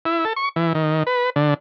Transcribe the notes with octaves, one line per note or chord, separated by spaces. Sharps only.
E4
A4
C#6
E3
D#3
B4
D3